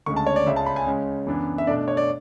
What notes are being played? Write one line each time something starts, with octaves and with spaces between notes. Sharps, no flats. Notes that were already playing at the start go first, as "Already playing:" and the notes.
D2 C#3 G#3 C#6
A5
C#5
D5
C#2 C#3 G#3 C#4 E5
A5
B5
G#5
C#3 G#3 C#4
F#2 E3 B3 D4
E5
B2 A3 D4 D5
C#5
D5